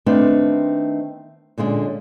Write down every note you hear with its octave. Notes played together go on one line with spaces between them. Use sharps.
D#3 A3 B3 C4 D4
A#2 D3 G#3 C#4